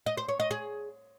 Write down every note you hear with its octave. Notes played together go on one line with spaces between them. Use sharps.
D#5
C5
C#5
D#5
G#4